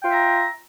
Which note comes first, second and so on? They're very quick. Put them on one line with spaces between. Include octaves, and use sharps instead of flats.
G5 F4 E5 A#5